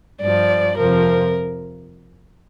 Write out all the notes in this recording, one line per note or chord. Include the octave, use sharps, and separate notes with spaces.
G2 F3 D5
F2 C3 F3 A#4